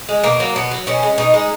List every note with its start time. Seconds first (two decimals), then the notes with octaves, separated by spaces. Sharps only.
0.09 G#3
0.23 B2 A#3
0.40 F#3
0.56 B2 B3
0.71 F#3
0.87 B2 C#4
1.03 G#3
1.18 B2 D#4
1.34 G#3